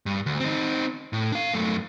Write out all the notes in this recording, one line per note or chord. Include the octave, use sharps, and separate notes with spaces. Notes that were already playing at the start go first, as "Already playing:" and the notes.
G2
D2
C4 D#4
A2
D4 F5
F#2 A3